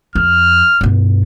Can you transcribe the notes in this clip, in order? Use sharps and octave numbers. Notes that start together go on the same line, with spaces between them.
F2 F6
G2 B2